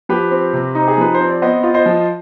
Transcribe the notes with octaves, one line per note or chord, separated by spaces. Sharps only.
F3 G4 B4
C4
C3
D#4
G#4
F3 B4
C5
C4
D5
B3 C5 D#5
F4
C5 D#5
F3